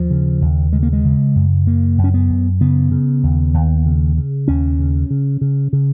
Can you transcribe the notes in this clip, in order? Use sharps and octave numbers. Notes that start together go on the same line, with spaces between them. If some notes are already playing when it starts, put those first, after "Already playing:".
Already playing: D#2 F3
C#3
D#2
C#3 G#3
A#3
G#3
C#3
F#2
C#3 A#3
F#2
C#4
B3
F#2
C#3 B3
C#3
D#2
D#2
C#3
C#3
D#2 C#4
C#3
C#3
C#3
C#3